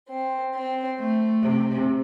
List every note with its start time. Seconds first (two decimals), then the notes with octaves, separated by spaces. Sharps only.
0.09 C4
0.54 C4
0.99 A3
1.44 C3